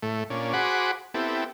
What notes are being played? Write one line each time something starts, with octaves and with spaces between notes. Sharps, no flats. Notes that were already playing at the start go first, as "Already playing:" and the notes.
A2 A3
A#2 C#4 D4
F#4 G#4 C5 F#5 B5 D6
B3 C4 E4 G4 A4